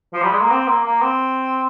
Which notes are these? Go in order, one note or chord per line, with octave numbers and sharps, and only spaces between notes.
F3
G3
G#3
A#3
C4
A#3
A#3
C4